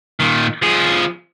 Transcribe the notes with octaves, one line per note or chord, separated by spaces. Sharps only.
A#2 D#3
F3 G#4